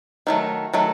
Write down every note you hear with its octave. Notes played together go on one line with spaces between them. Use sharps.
D#3 F#3 A3
D#3 F#3 A3